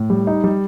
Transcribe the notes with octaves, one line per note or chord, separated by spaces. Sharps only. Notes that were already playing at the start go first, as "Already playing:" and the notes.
Already playing: A2
G3
D#4
G3